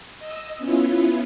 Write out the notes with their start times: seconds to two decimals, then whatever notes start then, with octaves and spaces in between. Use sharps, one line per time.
0.19 D#5 E6
0.58 B3 C#4 E4 F4